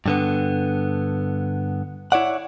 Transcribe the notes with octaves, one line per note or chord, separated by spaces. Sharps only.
G2 D3 B3
E4 C#5 D5 F#5